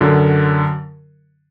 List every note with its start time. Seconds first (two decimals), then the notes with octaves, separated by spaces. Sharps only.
0.01 F#2 D3 F#3